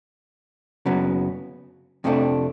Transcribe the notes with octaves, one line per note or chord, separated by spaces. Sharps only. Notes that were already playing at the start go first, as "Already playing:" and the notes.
F#2 C#3 F#3 B3
F2 C3 F3 A3 D4